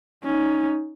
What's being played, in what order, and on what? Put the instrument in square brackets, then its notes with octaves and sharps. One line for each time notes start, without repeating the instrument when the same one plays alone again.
[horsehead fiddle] C#4 D#4